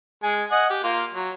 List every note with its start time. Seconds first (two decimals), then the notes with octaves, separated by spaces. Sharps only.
0.24 G#3 G#5
0.51 D#5 F#5 G#5
0.70 G4
0.84 A#3 F4
1.14 F#3